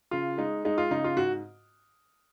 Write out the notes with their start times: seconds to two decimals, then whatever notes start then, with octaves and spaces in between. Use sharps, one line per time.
0.11 C#3 F4
0.38 G#3 D#4
0.65 G#3 D#4
0.78 F4
0.91 C#3 D#4
1.04 F4
1.16 G#2 F#4